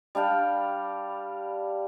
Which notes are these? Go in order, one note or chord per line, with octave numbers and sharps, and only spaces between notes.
G3 D4 F5 G5